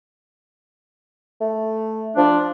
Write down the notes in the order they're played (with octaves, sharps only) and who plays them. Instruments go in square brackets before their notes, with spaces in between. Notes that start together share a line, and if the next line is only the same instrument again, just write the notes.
[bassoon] A3
[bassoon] F3 [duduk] D4